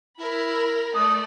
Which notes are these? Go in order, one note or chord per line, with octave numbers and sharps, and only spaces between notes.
E4 A#4 B5
A3 D5 D#6